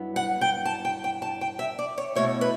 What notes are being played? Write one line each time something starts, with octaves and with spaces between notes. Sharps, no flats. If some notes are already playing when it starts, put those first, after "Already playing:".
Already playing: G2 F#3 B3 E4
F#5
G5
A5
G5
G5
A5
G5
E5
D5
C#5
B2 A3 E4 C#5
B4